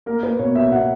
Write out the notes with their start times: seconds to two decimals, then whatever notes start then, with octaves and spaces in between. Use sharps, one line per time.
0.06 A#3 A#4
0.23 A#3 B4
0.39 B2 C#5
0.55 B2 E5
0.72 B2 F#5